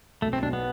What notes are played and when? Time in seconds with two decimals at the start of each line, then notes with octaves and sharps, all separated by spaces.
0.22 B1 A3
0.33 C4
0.43 B1 D4
0.53 B3